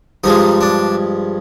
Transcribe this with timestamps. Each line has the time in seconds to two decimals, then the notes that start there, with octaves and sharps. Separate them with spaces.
0.24 G2 F3 G#3 D#4
0.61 D4